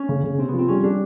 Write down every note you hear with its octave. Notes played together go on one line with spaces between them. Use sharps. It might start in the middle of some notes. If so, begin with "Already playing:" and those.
Already playing: C#4
C#3
C#3
C3 C4
F3 B3
C4
G3 C#4
G3 D4